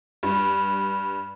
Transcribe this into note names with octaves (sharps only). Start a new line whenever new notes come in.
G2